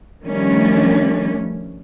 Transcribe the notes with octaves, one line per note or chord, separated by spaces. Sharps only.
D#3 F3 G3 A3 C#4 D4